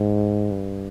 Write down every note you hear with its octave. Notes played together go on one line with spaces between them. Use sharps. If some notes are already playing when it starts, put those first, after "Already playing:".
Already playing: G#2
G2